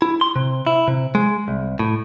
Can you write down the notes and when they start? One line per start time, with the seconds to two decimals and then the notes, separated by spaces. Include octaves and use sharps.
0.02 E4
0.21 C6
0.36 C3
0.67 E4
0.88 C3
1.15 G#3
1.48 C2
1.79 A2